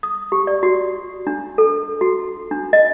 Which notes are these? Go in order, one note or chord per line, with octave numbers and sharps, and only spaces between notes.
D#6
G4
D5
F#4
D4
A4
F#4
D4
D#5